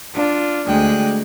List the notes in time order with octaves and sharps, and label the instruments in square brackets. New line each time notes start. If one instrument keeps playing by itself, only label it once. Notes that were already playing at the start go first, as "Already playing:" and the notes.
[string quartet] D4 F4
D2 G#3 G#4 G5 F#6